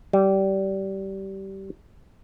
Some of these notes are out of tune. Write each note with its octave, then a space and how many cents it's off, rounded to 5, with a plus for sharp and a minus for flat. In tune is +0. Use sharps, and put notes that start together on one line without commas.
G3 -20